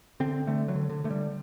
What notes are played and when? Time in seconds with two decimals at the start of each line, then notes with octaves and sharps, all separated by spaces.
0.20 D3 C4
0.47 D3 A3
0.68 F#3
0.75 D3
0.89 D3
1.04 D3 A3
1.10 G3